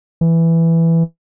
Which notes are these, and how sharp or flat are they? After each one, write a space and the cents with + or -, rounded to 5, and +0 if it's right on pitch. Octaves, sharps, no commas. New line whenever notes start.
E3 +5